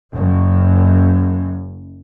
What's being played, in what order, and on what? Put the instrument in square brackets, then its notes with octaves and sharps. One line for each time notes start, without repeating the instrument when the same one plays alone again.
[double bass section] F#1 F#2